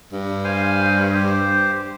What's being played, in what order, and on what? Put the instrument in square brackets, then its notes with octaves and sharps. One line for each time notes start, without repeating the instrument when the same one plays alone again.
[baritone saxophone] G2
[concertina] C5 F5 G#5
G4 C5